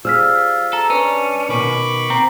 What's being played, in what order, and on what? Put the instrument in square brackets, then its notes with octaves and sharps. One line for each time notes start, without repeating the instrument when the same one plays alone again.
[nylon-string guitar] G3 G#4 C5 [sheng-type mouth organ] F4 [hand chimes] E6 F6 B6
[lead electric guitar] A4 [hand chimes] A#5
[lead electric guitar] C#4 [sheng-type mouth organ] D4 [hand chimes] B4
[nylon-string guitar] B2 D#3 [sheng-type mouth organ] B5 C#6 D6
[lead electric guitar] C4 [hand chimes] A#5